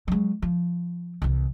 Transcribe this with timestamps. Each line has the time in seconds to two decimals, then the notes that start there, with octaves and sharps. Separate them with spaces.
0.08 F#3 G#3
0.42 F3
1.22 C2 E3